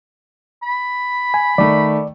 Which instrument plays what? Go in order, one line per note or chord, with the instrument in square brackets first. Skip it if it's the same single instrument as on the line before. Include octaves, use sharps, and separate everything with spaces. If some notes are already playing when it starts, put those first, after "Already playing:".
[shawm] B5
[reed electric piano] G#5
[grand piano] D#3 A3 [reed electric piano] D5